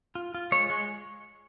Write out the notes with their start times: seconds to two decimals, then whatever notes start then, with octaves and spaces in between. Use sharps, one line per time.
0.15 F4
0.34 F4
0.52 G#3 C#5
0.70 G#3